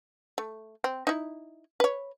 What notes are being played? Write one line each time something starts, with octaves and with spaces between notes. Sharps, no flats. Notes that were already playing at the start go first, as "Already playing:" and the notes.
A3
C4
D#4 E4
B4 C#5